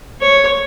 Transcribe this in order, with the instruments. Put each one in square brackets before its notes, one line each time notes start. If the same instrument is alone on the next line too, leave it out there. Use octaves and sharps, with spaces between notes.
[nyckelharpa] C#5